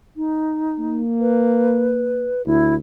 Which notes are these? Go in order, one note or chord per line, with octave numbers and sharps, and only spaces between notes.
D#4
A#3
B4
D2 E4